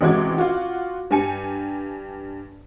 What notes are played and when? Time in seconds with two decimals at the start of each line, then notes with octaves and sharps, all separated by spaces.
0.01 A1 C3 G#3 F#4 D6 G#6
0.38 F4 F#4
1.11 G2 G4 G#5 C#7